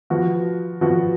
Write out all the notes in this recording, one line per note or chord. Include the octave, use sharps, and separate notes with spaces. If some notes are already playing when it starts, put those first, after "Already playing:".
F3 B3 F#4
F3 B3 F#4